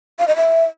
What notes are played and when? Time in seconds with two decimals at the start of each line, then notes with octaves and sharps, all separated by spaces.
0.19 F5
0.28 D#5
0.36 E5